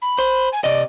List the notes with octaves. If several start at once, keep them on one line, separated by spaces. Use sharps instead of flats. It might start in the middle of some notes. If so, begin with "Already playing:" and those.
B5
C5
G#5
C3 D5 D#5